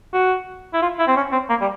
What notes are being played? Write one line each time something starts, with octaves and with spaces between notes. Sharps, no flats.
F#4
E4
F4
E4
C4
C#4
C4
A#3
G3